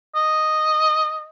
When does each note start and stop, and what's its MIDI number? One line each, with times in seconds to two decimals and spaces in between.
0.15 1.28 75